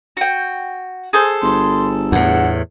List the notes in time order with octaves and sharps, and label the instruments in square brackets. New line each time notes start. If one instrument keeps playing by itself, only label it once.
[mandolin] F#4 G5
G#4 A4 C5
[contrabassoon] G1 [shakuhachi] C6
[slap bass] E2 A2 [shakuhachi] F#5